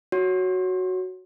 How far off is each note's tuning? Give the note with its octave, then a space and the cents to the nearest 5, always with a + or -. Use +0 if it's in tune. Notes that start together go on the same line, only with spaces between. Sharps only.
F#4 +0 C#5 +0